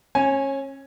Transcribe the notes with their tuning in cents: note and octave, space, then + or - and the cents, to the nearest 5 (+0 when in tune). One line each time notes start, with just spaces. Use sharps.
C#4 -25 G#5 +0